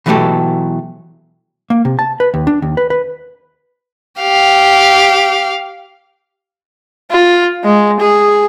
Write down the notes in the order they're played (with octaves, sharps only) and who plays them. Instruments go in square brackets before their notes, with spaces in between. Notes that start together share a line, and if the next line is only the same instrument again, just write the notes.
[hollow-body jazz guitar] B2 E3 F#3 A3 G4 A4
A#3
C3
A5
B4
D#2
D4
D#2
B4
B4
[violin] G4 F5
[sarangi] F4
G#3
G#4